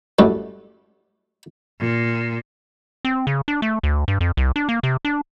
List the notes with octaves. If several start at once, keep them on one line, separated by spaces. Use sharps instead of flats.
F#2 A2 G3
A#2
C4
C#3
D4
A3
D2
G2
F2
C2
D4
A#3
C3
D4